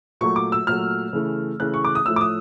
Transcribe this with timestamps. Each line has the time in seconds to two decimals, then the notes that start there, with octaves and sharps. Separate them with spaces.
0.21 A#2 F#3 A3 C#6
0.36 D6
0.52 E6
0.67 A#2 F#3 A3 F6
1.13 C#3 E3 A3
1.60 C#3 E3 A3 F#6
1.74 C#6
1.85 D6
1.95 D#6
2.06 A2 F3 A3 E6
2.16 D6
2.21 D#6